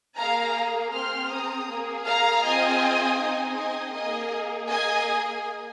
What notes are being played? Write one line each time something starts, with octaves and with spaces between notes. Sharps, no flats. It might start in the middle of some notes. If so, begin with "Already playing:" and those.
A#3 G#4 F5 A#5
C4 G#4 C6 F6
A#5 D#6
A#3 G#4
F5 A#5
C4 F4 G#4 D#5 G#5
C4 D#4 G#4 D#5 G#5
D#5 G#5
A#3 G#4 D#5 G#5
A#3 G#4 D#5 G#5